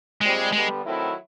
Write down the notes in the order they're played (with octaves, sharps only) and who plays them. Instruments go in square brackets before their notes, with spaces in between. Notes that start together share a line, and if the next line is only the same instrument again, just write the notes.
[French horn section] A#2 G3 C4 [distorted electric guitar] G#3
[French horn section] D3 G3 B3 [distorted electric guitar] G#3
[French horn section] D#3 F#3 A3 C4 E4